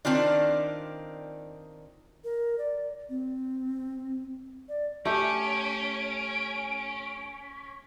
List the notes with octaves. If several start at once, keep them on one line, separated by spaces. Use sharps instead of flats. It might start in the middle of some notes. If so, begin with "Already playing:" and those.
D#3 C4 D4 F4 D5
A#4
D5
C4
D5
A3 C#4 G4 D7